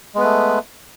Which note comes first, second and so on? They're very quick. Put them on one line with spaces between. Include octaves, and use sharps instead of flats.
G#3 B3 B4 A3